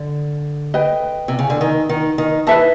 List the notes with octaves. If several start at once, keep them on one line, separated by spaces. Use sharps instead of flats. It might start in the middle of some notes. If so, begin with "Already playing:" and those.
Already playing: D3
B4 D#5 G5
C3
C#3
D3
D#3
D#3
D#3
E3 B4 E5 A5